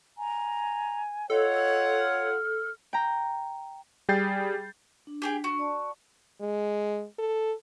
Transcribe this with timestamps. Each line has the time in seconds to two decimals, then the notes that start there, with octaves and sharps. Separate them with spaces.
0.18 G#5 A#5
1.30 F4 A4 C#5 D#5 F#5
1.99 F6
2.93 G5 A#5
4.09 G3 G#4 G5 G6 A6 C7
5.07 D4
5.22 G4 G#4 G5
5.44 F#4
5.59 D5 A5
6.40 G#3
7.19 A4